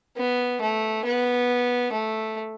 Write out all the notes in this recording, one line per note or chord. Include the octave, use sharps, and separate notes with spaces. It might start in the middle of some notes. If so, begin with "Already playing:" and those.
B3
A3
B3
A3